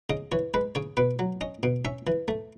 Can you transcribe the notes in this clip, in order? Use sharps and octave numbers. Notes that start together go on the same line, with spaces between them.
C#3 D#5
E3 C#5
G#3 B4
C#3 C#5
B2 B4
F#3
C#4 D#5
B2
C#4 E5
E3
A3